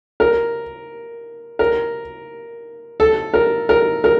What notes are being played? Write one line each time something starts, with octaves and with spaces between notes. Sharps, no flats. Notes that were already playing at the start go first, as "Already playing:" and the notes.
A#4
A#4
A4
A#4
A#4
A#4